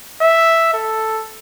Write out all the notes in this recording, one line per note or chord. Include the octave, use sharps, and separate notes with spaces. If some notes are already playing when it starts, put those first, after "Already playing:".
E5
A4